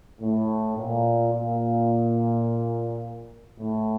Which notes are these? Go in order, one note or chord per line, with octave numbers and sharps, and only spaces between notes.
A2
A#2
A#2
A2